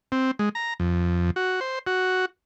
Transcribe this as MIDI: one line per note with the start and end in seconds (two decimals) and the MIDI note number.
0.12 0.31 60
0.39 0.49 56
0.55 0.74 82
0.80 1.31 41
1.36 1.60 66
1.61 1.79 72
1.87 2.25 66